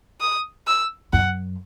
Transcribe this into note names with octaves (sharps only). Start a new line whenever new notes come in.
D#6
E6
F#2 F#5